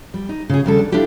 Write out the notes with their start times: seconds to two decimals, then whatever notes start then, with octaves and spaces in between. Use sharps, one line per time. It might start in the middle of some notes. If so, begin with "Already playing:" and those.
0.14 G3
0.29 D#4
0.49 C#3 G#4
0.64 D#2 C#3 G3 A4
0.78 D4
0.92 D4 E4 F4 G4 A4